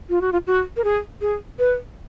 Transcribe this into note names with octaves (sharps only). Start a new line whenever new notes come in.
F4
F#4
F4
F#4
A#4
G#4
G#4
B4